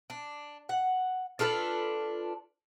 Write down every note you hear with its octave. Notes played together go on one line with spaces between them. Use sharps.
D4
F#5
D4 F4 A4 B4